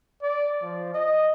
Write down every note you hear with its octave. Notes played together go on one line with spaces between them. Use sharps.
D5
F3
D#5